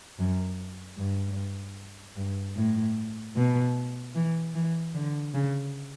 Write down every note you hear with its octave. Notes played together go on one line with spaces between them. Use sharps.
F#2
G2
G2
A2
B2
E3
E3
D3
C#3